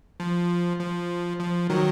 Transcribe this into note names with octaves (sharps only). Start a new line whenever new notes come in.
F3
F3
F3
D#3 F#3